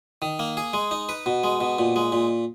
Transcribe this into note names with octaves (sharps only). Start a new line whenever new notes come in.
D#3
A#3
G#4
G#3
D#4
B4
B2
G#3
B2
A#2
G#3
A#2